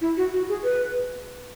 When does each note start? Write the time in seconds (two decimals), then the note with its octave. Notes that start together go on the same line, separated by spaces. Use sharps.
0.01 E4
0.17 F#4
0.33 F#4
0.49 G#4
0.64 B4